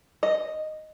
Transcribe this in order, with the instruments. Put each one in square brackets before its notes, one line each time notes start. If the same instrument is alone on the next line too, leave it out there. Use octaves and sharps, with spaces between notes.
[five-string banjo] D#5